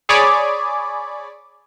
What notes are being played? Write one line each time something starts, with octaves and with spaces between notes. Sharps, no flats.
G#4 C#5 D5 G#5 B5 D6